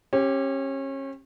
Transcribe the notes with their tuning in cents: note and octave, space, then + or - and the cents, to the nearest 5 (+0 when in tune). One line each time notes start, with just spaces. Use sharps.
C#4 -30 G4 +0